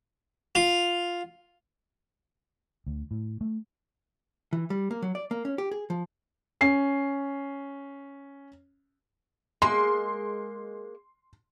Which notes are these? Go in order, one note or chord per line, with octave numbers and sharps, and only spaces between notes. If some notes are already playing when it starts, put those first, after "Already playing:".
F4
D2
A2
A3
E3
G3
A#3
F#3
D5
A#3
C#4
G4
G#4
F3
C#4 C7
G#3 A#3 C6